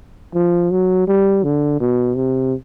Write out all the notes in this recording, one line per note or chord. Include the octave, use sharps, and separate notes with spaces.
F3
F#3
G3
D3
B2
C3